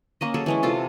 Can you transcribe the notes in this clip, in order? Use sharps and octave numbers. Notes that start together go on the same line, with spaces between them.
A#3 C#4 D#5
F#3 G#4 A4 C#5
E3 G#3 C#4
C3 F4 A4 A5